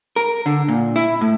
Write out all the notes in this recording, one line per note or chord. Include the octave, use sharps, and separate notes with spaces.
A#4
D3
A#2
E4
A2